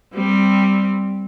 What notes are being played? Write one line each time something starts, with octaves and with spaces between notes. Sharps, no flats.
G3 C4